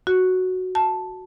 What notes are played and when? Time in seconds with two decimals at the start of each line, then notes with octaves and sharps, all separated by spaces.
0.07 F#4
0.75 A5